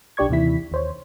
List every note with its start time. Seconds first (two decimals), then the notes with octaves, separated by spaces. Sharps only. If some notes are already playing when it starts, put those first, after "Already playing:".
0.17 B1 D4 G4 D5 C#6 G#6
0.29 D#2 C3 D#3 E3 E4 B6
0.72 D#2 C5 C#5